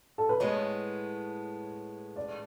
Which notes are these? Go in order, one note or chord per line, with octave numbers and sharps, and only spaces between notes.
A4
B4
A2 G#3 B3 C#5
D5